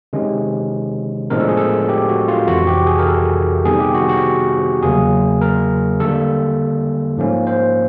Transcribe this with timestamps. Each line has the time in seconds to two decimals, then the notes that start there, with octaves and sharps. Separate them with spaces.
0.13 C3 D#3 G#3 C#4
1.30 A2 F3 G#3 B3 D4 A#4
1.40 A4
1.49 G#4
1.57 A4
1.89 G4
2.09 F#4
2.28 F4
2.48 F2 C3 E3 F#4
2.67 G4
2.87 G#4
2.99 A#4
3.07 A4
3.65 C3 D#3 G3 B3 G#4
3.80 G4
3.94 F#4
4.09 F#4
4.82 E2 C#3 F#3 A#3 G#4
5.41 A#4
6.00 D3 G3 A#3 A4
7.17 G#2 F3 A#3 C#4
7.47 C5